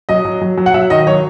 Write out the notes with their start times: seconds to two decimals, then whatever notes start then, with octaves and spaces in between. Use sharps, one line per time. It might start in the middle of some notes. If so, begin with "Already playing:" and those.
0.09 F#3 D#5
0.25 F#3
0.41 F#3
0.57 F#3
0.66 F#5
0.74 F#3 E5
0.90 D#3 D#5
1.07 F#3 C#5